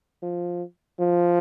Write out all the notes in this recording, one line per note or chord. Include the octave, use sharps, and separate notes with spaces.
F3
F3